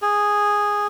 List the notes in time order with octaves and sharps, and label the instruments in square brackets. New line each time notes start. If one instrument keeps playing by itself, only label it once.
[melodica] G#4